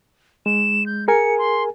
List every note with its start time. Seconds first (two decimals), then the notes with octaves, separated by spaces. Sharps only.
0.46 G#3 E7
0.86 G6
1.08 G#4 A#4 G#5 C#7
1.38 C6